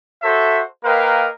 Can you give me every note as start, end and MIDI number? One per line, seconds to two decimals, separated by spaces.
0.23 0.61 66
0.23 0.61 69
0.23 0.61 72
0.23 0.61 76
0.84 1.29 58
0.84 1.29 70
0.84 1.29 71
0.84 1.29 75
0.84 1.29 77
0.84 1.29 79